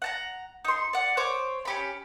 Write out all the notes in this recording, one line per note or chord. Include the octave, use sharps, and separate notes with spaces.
F#5 A5 A#5
D#4 C6
D5 F#5
C5 C#5 D6
C#4 G4 B5